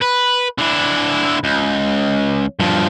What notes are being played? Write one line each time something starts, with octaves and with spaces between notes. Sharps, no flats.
B4
D3 E4
C#2
G2 F3